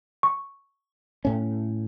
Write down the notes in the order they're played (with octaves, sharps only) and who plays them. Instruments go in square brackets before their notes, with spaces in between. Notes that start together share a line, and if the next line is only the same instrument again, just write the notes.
[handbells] C#6
[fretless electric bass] A2 C#4